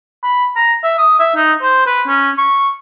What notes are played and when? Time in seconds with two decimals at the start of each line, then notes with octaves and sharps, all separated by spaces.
0.24 B5
0.56 A#5
0.84 E5
0.98 D#6
1.19 E5
1.36 D#4
1.62 C5
1.86 B4
2.07 C#4
2.38 C#6